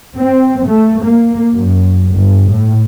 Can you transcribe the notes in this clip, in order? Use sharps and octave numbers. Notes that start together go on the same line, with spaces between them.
C4
A3
A#3
F#2
G1
A2